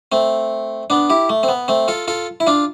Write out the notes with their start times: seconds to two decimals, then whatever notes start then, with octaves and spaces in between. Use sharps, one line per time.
0.12 A3 C4
0.90 B3 D4
1.10 E4 G4
1.29 A3
1.43 C4
1.48 B3
1.68 A3 C4
1.88 F4 A4
2.08 F4 A4
2.40 E4
2.47 D4 F4